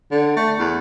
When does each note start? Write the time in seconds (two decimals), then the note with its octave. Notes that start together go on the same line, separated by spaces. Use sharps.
0.11 D3
0.36 A3
0.59 E2